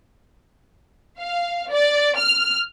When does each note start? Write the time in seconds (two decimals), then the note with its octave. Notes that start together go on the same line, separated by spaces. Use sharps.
1.19 F5
1.71 D5
2.17 F6